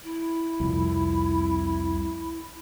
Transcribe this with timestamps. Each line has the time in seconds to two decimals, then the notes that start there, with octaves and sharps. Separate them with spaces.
0.04 E4
0.60 C2 F2